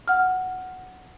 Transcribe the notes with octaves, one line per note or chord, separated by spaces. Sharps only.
F#5 F6